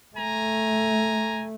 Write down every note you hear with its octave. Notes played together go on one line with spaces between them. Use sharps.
A3 G#5 A#5